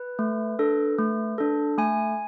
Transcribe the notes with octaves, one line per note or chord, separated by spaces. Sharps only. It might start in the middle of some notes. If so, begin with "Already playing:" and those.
Already playing: B4
A3
D4 A4
A3
D4 A4
A3 G#5